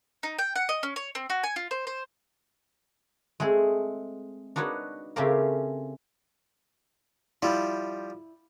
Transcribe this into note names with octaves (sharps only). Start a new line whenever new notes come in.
D#4
G5
F#5
D#5
C#4
C#5
C4
F#4
G#5
F4
C5
C5
G#3 A3 C4 G#4
D4 D#4 F#4 B4 C#5
C#3 A3 C4 C#4 G4 A#4
F3 G3 E4